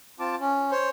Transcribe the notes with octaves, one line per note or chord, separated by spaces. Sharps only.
C4 F4 A5 D6
C#4
C5 C#5